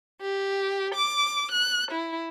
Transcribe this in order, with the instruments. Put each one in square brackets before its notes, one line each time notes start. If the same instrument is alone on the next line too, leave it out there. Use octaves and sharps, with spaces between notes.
[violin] G4
D6
F#6
E4